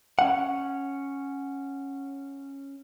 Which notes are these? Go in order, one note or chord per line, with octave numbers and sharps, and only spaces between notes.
C#4 F#5